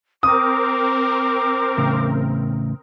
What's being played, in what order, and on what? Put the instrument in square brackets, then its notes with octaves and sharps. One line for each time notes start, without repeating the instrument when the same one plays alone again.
[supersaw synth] C4 A#4 [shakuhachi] D6 [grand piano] D#6
[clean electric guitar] E2 A2 C#3